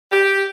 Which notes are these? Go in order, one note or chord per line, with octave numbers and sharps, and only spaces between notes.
G4